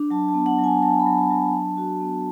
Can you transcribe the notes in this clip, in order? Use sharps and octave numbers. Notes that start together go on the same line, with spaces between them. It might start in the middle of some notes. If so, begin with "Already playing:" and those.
Already playing: D4
F#3 A5
A5
B3
F#5
F#3
G#5
F#3 A5
B5
F#3
A5
F#3
A5
D4
F#4
B3